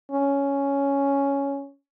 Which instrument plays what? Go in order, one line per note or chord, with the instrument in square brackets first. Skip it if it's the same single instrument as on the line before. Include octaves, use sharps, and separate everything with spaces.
[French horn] C#4